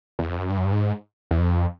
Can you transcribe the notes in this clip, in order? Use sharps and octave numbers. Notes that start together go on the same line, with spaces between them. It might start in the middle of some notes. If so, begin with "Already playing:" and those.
E2
F2
F#2
G2
F#2
G2
G#2
E2
F2